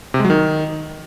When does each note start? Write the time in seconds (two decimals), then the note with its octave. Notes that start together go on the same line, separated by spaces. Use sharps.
0.14 C3
0.19 G#3
0.25 F#3
0.30 D#3